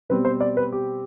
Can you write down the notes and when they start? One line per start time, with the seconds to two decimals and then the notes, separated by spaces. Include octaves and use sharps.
0.09 B2 G3 C4 B4
0.25 C5
0.41 D5
0.57 B4
0.72 G4